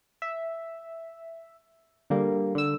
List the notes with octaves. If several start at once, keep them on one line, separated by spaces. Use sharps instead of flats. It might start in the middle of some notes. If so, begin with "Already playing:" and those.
E5
D3 G3 A#3
D3 E6